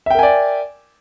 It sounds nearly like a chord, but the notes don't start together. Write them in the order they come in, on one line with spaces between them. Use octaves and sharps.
E5 G5 A#4 G#5 D5